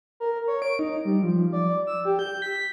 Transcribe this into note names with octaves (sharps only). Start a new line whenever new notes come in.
A#4
C#5
D7
D#4
G3
F3
D5
E6
G4
G6
B6